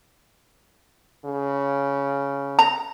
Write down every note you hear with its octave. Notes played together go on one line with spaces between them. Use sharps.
C#3
A#5